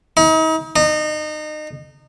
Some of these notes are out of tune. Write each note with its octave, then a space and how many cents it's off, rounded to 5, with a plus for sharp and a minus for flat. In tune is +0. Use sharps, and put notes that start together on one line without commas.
D#4 +40
D#4 -30